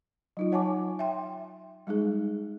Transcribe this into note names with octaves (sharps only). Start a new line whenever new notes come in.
F#3 D#4 F4
C#5 F#5 G#5 A5 C#6 D6
E5 G5 C6
G3 G#3 D#4 G#4